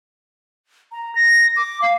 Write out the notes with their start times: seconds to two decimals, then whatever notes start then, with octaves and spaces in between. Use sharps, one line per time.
0.92 A#5
1.15 A#6
1.56 D6
1.82 F5